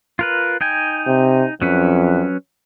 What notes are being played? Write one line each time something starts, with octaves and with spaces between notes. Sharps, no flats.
F4 A#4 B4
D#4 G5 G#5
C3
F2 F#3 C#4 B4